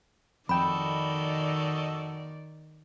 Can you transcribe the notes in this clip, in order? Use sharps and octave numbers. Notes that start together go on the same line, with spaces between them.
F2 D#3 F#4 A4 D5 D#5 G5 B5